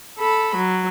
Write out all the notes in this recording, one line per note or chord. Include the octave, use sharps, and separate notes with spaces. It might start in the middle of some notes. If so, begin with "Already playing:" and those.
A4 B5
F#3